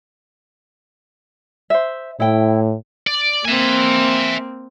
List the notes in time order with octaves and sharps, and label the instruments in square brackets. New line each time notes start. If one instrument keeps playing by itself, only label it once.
[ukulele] C5 E5
[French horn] A2 [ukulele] E4 G5
[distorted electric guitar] D5
[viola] A#3 C4 [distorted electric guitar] E5 G#5